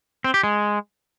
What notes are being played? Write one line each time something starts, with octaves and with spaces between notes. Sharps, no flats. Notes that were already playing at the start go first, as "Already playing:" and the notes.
C4
G4
G#3